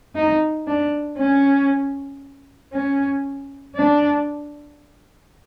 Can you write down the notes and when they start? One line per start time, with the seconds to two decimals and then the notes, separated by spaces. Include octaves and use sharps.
0.15 D#4
0.67 D4
1.18 C#4
2.72 C#4
3.75 D4